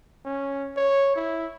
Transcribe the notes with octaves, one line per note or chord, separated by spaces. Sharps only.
C#4
C#5
E4